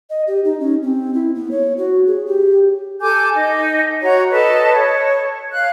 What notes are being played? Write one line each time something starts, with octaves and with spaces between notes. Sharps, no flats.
D#5
G4
D#4
C#4
C4
E4
B3
C#5
F#4
G#4
G4
A4 G#5 D6 G6
D#4
F#4 C#5 A#5
A4 B4 D#5 A5
C#5
F5 F#6